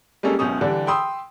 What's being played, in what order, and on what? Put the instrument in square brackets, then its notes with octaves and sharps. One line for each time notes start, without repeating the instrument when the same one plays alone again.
[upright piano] G3 G#3 A#3 C#4 A4
F#1 C#2 B2 C#4 D#6
D3 E3 G3 D4
G5 B5 C6 D#6 E6